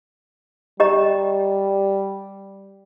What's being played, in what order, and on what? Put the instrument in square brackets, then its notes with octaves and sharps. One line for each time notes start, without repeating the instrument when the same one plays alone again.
[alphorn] G3 [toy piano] G4 D#5 A#5